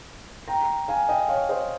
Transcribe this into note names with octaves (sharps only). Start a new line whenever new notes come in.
G5 A#5
F5 G#5
D#5 G5
C#5 F5
C5 D#5